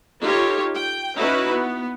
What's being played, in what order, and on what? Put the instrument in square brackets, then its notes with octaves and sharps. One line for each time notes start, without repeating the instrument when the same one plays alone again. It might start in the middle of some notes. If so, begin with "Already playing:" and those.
[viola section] D#4 F4 G4 A4 C#5
G5
C#4 D#4 E4 F#4 B4
B3